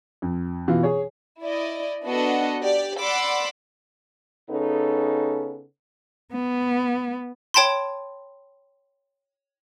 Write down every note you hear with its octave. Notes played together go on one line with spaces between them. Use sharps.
F2
B2 E3 F4
G#4 C#5
E4 D5 D#5
B3 D4 F#4 A4 D#5 F#5
G4 D5
D5 F#5 B5 C6 D6 E6
C#3 B3 C#4 D#4 A4
B3
C#5 G5 A5 B5 C6